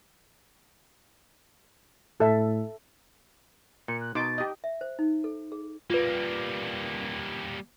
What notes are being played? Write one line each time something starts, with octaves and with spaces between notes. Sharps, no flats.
A2 A4 E5 A5
A#2 C#7
F#6
B2 D#4 C6 D6 A6
G4 D#5
E5
C5
D#4
A4
G#4
G3 A#3 F4 B4